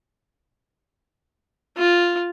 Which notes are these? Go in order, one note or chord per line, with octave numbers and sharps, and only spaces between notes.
F4